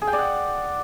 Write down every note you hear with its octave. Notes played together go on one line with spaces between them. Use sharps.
G#4
G5
D5
F#5